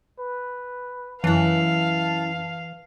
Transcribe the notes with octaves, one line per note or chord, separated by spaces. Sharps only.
B4
F#2 E3 E4 F5 A5